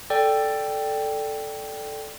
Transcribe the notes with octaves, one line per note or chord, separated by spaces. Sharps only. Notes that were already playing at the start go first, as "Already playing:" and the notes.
A4 D5 G5